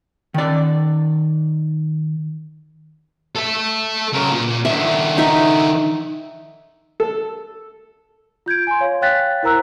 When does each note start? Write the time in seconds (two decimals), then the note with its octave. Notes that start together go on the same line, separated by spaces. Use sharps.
0.34 D#3 D5
3.35 A4 E5
4.13 C#3 A#4
4.32 A#2
4.65 D#3 D4 E5
5.18 D#4 E5
7.00 A4
8.46 F4 G6 G#6 D7
8.67 G#5 C6
8.81 C#5 F5
9.01 C#5 F5 G5 F#6 A6 B6
9.43 E4 A#4 C5 A#5 E6 F#6